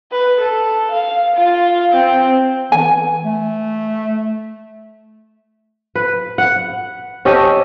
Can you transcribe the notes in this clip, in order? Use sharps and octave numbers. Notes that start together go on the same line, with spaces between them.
B4
A4
F5
F4
C4
E3 G#5
A3
B4
F#5
C#4 G4 A4 D#5